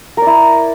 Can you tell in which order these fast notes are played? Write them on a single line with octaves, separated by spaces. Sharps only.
A#4 D5 E4